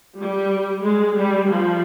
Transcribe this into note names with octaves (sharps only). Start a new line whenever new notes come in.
G3
G#3
G3
F3